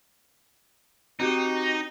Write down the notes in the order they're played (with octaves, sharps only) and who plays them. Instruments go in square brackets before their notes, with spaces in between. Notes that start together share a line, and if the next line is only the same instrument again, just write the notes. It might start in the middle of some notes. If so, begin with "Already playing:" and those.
[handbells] C4 F#4 G4 [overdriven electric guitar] D#4